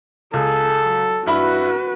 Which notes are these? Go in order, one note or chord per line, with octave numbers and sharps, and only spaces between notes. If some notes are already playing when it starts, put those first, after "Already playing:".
C#2 G#4 A4
F#3
G2 E4 F#4 B4 B5